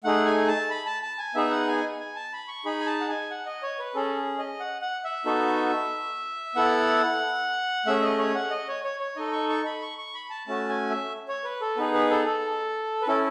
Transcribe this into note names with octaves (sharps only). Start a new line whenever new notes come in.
A3 D#4 G#4 F#5
G#5
A5
B5
A5
A5
G#5
B3 D#4 G#4 E5
F#5
G#5
G#5
A5
B5
C#6
D#4 G#4 B5
G#5
A5
F#5
G#5
F#5
D#5
C#5
B4
C#4 G#4 A4
D#5
F#5
F#5
E5
B3 D#4 F#4 A4
B3 E4 A4 F#5
A3 C#4 G#4 E5
D#5
C#5
F#5
D#5
C#5
C#5
C#5
D#4 A4 D#5
C#6
C#6
B5
C#6
C#6
B5
A5
A3 C#4 F#4 A5
G#5
E5
C#5
B4
A4
B3 D#4 G#4 B4
B4
A4
A4
B4
C#4 E4 A4